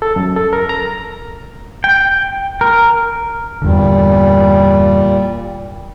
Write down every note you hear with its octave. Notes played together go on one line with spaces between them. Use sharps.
A4
F#2
A4
A#4
A#5
G5
A#4
E2 G2 A#2 D3 G3